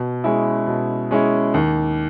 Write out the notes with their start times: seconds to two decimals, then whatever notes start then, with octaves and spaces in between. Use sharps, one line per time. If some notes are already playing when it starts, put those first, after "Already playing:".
Already playing: B2
0.24 G#3 C#4 E4
0.67 B2
1.11 G#3 C#4 E4
1.54 D#2